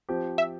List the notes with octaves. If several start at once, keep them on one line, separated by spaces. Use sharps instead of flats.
F3 C4 G4
E5